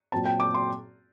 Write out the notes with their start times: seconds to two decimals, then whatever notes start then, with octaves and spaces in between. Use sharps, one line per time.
0.12 A#2 F#3 C4 A5
0.25 G5
0.40 D6
0.54 C6